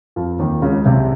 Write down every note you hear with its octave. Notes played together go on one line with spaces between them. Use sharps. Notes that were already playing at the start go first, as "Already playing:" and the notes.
F2 F3
D#2 D#3
C#2 C#3
C2 C3